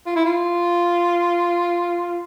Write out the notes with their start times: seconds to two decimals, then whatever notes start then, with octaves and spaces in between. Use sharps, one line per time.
0.06 F4
0.16 E4
0.25 F4